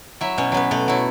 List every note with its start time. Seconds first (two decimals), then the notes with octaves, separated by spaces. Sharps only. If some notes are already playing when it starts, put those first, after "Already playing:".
0.21 F#3 E4 E5
0.38 B2 C#4 C#5
0.52 F#3 B3 B4
0.71 B2 A3 A4
0.88 F#3 E4